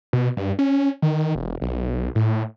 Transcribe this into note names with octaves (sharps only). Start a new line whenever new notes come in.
B2
G2
C#4
D#3
E1
B1
A2